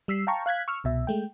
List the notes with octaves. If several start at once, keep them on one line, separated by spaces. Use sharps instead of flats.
G3 E6 B6 C7
F5 G5 A5 A#5 C#6
F5 F#6 G#6 B6
C#6 E6 F6
C2 B2 E5
G#3 A3 G5